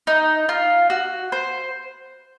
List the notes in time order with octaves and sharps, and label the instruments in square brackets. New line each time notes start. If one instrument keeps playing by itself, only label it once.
[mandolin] D#4
F4
F#4
C5